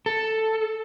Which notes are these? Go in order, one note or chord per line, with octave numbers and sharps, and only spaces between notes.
A4